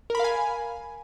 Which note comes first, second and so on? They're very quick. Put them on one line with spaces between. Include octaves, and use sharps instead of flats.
A#4 B5 F5 G#5